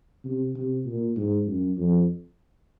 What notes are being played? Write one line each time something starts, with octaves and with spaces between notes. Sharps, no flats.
C3
C3
A#2
G#2
F#2
F2